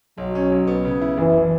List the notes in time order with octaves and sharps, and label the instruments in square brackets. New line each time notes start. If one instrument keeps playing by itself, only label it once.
[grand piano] B1 [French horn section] F#3
[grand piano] C#4
B1
B3
C#3
E4
[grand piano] F#1 [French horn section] E3